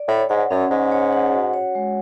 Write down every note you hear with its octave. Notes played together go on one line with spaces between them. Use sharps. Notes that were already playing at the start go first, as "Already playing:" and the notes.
Already playing: D5
A2 C#5
G#2 F#5
F#2 C#4
G#2 G#4
C#5
F#5
F#4
C#5
G#3